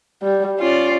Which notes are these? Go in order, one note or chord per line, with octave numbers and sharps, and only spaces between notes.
G3
C#4 F4 D5